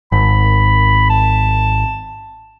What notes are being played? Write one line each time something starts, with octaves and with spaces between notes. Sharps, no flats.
G#1 B5
A5